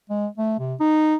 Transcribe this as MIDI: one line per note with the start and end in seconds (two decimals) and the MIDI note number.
0.10 0.27 56
0.38 0.58 57
0.59 0.75 48
0.80 1.16 63